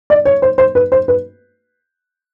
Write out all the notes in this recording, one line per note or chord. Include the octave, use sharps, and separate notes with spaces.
D5
C#5
C5
C5
B4
C5
B4